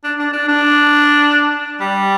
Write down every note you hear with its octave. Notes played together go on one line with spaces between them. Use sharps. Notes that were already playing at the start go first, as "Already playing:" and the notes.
D4
D4
D4
D4
G3